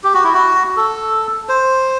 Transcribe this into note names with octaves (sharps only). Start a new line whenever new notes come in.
G4
F#4
E4
F#4
A4
C5